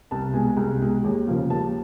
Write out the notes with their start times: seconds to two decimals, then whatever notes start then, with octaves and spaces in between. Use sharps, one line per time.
0.11 C2 A5
0.34 B2 G#3 G#5
0.57 C2
0.81 B2 G#3
1.04 D#2
1.27 C#3 F3 A#3
1.50 D#2 A5